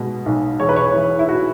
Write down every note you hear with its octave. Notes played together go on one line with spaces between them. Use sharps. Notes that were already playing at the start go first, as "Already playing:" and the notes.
Already playing: B2 G#3
B1
E1 C#5
B4
C#5
E3
E4
F#4